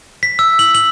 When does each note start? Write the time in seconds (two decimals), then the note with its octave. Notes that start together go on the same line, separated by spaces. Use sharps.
0.23 B6
0.39 E6
0.59 F#7
0.75 F#7